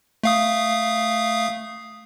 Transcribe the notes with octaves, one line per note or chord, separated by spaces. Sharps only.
A3 F5 D#6